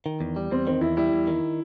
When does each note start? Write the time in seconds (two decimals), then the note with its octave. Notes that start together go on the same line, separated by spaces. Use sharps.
0.06 D#3
0.21 E2
0.36 G3
0.51 E2 C4
0.67 D#3 C4
0.81 E2 E4
0.97 G3 E4
1.12 E2
1.27 D#3